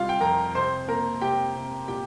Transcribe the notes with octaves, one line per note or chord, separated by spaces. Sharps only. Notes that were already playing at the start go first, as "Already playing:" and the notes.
Already playing: C3 G3 F4 F5
G5
F2 A#4 A#5
C3 C5 C6
A#3 A#4 A#5
C3 G4 G5
C3
A#2 G4 G5